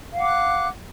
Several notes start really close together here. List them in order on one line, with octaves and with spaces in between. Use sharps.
F5 F#5 D6 F#6